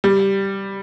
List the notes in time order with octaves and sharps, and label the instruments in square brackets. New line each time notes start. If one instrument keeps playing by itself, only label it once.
[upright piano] G3